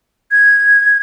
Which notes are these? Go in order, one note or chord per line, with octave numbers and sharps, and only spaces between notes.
G#6